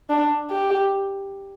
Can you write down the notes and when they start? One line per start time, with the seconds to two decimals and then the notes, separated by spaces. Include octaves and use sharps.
0.09 D4
0.50 G4